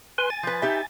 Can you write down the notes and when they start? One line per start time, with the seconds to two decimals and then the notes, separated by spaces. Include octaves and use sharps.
0.18 B4 G#5 C6
0.30 G#5 A6
0.43 F3 B4
0.62 D#4 G4 E5